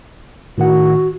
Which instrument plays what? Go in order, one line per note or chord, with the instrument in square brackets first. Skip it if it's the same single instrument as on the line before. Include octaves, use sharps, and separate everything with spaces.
[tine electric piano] A2 D#3 F#5 [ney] F#4